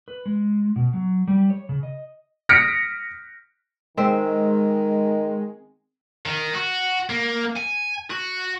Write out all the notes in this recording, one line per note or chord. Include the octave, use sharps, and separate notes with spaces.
B4
G#3
B2
F#3
G3
C#5
C#3
D#5
D#6 F6 A#6 B6 C#7 D7
D#3 G#3 C4 E5
D#3
F#4
A#3
G#5
F#4